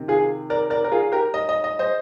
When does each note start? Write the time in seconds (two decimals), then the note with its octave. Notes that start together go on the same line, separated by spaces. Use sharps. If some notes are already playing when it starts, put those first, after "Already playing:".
Already playing: C3 D#3
0.08 F4 G#4
0.50 A#4 D5
0.70 A#4 D5
0.84 A#4
0.92 F4 G#4
1.12 G4 A#4
1.34 D#5
1.49 D#5
1.64 D#5
1.79 C5 D#5